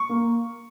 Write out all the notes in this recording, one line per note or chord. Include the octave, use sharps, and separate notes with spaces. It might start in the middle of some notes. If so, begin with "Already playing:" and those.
Already playing: C#6
A#3